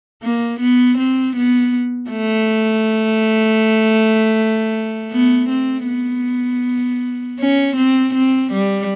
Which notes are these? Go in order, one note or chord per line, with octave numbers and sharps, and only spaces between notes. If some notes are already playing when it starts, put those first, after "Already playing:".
A#3
B3
C4
B3
A3
B3
C4
B3
C#4
C4
C4
G3